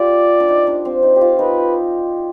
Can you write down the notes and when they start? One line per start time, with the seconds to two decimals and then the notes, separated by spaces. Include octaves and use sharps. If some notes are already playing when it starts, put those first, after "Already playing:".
Already playing: F4 G4 D5
0.40 D4
0.48 D#4
0.67 D4
0.85 C4
1.03 D#4
1.16 G4
1.21 F4
1.39 D#4 B4